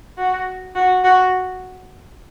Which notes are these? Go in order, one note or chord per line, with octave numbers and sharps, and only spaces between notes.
F#4
F#4
F#4